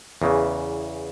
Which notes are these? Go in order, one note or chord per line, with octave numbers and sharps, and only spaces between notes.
E2 C#3 E3